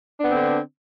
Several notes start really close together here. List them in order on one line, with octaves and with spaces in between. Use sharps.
D4 B3 C4 D3